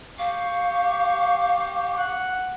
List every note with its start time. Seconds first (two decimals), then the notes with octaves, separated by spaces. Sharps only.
0.19 G4 F5 C#6
1.97 F#5